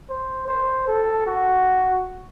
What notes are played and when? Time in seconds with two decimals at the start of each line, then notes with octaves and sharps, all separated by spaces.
0.10 C5
0.48 C5
0.88 A4
1.27 F#4